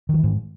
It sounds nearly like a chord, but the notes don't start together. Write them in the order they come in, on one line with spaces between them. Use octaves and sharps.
D#3 F#3 E3 G#2